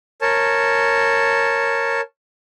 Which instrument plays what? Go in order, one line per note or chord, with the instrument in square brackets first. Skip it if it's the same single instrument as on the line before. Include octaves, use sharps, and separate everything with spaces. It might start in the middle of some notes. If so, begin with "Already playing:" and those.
[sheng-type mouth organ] A#4 C#5 A5